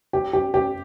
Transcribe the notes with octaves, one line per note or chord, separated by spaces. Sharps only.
G4
G4
G4